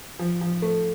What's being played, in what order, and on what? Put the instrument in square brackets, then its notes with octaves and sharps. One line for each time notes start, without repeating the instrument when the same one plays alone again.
[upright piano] F3
F3
A3